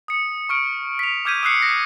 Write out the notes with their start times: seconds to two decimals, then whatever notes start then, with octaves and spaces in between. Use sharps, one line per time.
0.08 D#6 C#7
0.49 C#6 F6 D7
0.99 B6 F7
1.25 D6 F6 G6 G#6 B6 D#7
1.43 D#6 E6 F#6 C7 C#7
1.61 D#6 A#6 B6 C#7